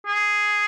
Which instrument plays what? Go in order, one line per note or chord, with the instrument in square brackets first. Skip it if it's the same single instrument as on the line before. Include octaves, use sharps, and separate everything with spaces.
[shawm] G#4